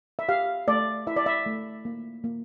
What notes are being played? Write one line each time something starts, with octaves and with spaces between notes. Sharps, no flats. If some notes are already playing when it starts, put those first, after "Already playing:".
E5
G4 F5
A3 D5
E4 E5
D5
E5
A3
A#3
A#3